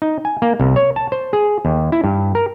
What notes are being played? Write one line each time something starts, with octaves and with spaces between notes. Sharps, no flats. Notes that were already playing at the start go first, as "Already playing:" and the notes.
D#4
G#5
A#3
C2
C#5
A5
C5
G#4
D#2
E4
G2
A#4